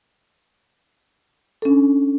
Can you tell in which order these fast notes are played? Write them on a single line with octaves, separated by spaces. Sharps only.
A4 C#4 D4